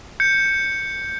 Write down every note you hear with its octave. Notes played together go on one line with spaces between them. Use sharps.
G6 C#7